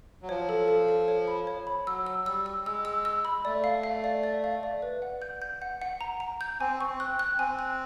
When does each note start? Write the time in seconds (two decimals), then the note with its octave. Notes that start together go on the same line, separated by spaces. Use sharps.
0.22 F#3
0.29 F3 C#5
0.49 A4
0.68 A4
0.89 A4
1.08 C#5
1.27 B5
1.47 C#5
1.67 B5
1.87 F#3 E6
2.07 E6
2.26 G3 E6
2.46 E6
2.66 G#3 E6
2.85 E6
3.05 E6
3.25 B5
3.45 A3 D5
3.64 F5
3.83 F5
4.04 D5
4.23 D5
4.44 F5
4.63 D5
4.82 B4
5.02 F#5
5.22 G6
5.42 G6
5.62 F#5
5.82 F#5
6.01 A#5
6.20 A#5
6.41 G6
6.60 C4 G#5
6.81 C#6
6.87 C4
7.00 F#6
7.19 F#6
7.39 C4 G#5
7.59 F#6